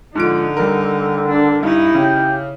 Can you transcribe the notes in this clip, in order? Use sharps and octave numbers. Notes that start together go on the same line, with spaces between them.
G#2 D3 F3 D#4 D7
G3 A#4
D4
G2 D#4 E4
C#3 G4